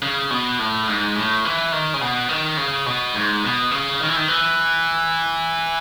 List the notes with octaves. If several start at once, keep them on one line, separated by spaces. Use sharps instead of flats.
C#3
B2
A2
G#2
A2
E3
D#3
C#3
B2
D#3
C#3
B2
G#2
B2
C#3
D#3
E3
D#3
E3